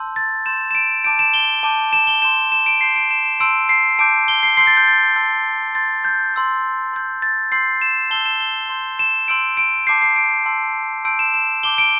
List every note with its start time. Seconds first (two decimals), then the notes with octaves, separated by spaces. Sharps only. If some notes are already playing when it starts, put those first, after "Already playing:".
Already playing: A5 C6 E6 G6
0.16 A6
0.46 C6 G6 E7
0.71 E7
0.75 D7
1.04 A5 D6 G6 D7
1.19 E7
1.34 G7
1.63 A5 D6 G6
1.93 E7
2.07 G7
2.22 C6 G6 E7
2.52 E7
2.66 D7
2.81 C6 G6 C7
2.96 D7
3.11 E7
3.25 E7
3.40 A5 C6 E6 G6 D7
3.69 C7
3.99 A5 D6 G6 D7
4.28 G7
4.43 C7
4.57 C6 E6 G6 C7
4.67 A6
4.77 G6
4.87 A6
5.16 A5 C6 E6 G6
5.75 C6 G6 A6
6.04 G6
6.34 C6 E6 G6
6.93 C6 G6
7.22 A6
7.52 C6 E6 G6 C7
7.82 E7
8.11 A5 E6 G6 G7
8.26 E7
8.41 G7
8.69 C6 G6
8.99 E7
9.28 C6 E6 G6 D7
9.57 D7
9.87 A5 D6 G6 C7
10.02 C7
10.16 D7
10.46 A5 C6 E6
11.05 A5 C6 E6 G6 D7
11.19 E7
11.34 E7
11.63 A5 D6 G6 G7
11.78 D7